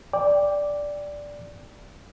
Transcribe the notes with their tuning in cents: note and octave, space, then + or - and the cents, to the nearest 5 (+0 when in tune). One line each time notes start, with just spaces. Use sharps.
D5 -5 G5 +15